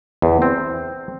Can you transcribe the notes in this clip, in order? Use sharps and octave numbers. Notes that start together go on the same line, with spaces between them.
E2
C4